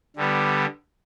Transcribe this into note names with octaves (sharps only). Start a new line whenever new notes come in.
D3 G3 B3